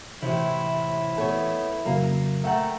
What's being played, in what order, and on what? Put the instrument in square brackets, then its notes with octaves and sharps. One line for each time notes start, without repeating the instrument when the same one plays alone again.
[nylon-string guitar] A2 C3 [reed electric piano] E3 [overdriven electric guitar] E4
[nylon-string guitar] A3 B3 C#5
[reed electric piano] F2 C#3 F#3 [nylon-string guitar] A#3
[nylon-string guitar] A3 F#5 [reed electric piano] E5 G5 A#5